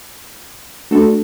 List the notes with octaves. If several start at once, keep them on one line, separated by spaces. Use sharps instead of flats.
A3 D4 F#4 A4